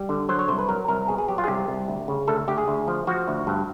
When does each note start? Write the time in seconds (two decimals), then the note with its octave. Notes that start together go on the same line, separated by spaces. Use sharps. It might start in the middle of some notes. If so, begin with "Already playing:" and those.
Already playing: G3
0.09 D3
0.29 F#3 C5
0.39 C#5
0.48 C2 C5
0.59 B4
0.69 F#3 A#4
0.88 C2 A#4
1.08 B2 G#4
1.18 G#4
1.28 F#3 G4
1.38 F4
1.44 G#4
1.48 C2 G4
1.68 C2
1.88 D2
2.08 C#3
2.28 D2 A4
2.48 D2 G4
2.58 G#4
2.68 D2
2.88 F3
3.07 F3 F#4
3.28 D2
3.47 G2